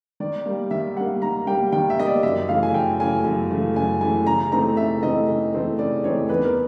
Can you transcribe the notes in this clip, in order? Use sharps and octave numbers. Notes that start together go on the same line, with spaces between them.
D#3 D5
G3 A#3
D#3 E5
G3 A#3 F#5
D#3 A#5
G3 A#3 G5
D#3 G5
E5
G3 A#3 D#5
D5
F#2 E5
C#3 E3 A3 F5
G#5
F#2 G5
C#3 E3 A3 G#5
F#2
C#3 E3 A3
F#2 G#5
C#3 E3 A3 G#5
C#3 A#5
E3 A3 C4 D#4 A#5
C#3 E5
E3 A3 C4 D#4 D#5
C#3
E3 A3 C4 D#4
C#3 D5
E3 A3 C4 D#4 C#5
E2 B4
A#4